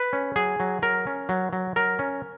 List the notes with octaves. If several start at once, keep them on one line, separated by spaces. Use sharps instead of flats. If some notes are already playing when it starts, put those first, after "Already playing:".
Already playing: B4
C#4
F#3 G#4
F#3
F#3 A#4
C#4
F#3
F#3
F#3 A#4
C#4